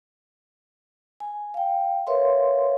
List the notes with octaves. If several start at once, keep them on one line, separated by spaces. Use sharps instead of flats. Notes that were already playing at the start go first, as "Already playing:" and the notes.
G#5
F5 G5
A#4 B4 C#5 E5 F5 C6